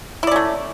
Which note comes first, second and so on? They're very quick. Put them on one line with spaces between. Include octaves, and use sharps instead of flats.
E4 D5 C#4 A3